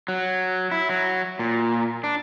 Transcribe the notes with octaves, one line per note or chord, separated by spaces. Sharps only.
F#3
E4
F#3
A#2
D4